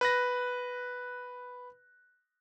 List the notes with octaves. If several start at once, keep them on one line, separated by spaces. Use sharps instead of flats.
B4 F#6 A#6